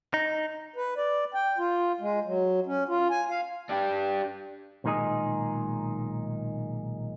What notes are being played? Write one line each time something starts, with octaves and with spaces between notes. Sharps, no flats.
D#4
B4
D5
G5
F4
G#3
F#3
C#4
F4
G#5
F5
D4 G4
B1 A#2 D#3 G#3 D#4 G#4